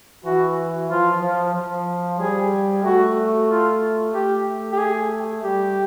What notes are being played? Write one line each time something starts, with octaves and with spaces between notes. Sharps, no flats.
E3 F#4
F3 F4
F3
F3
G3 G#4
A3 F#4
F4
A3 G4
G4
G#4
G3 G4